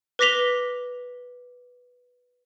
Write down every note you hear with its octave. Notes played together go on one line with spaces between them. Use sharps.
B4 D6 A#6 B6 F7 G7